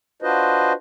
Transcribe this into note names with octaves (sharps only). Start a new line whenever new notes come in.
D4 F4 F#4 B4 C5 D#5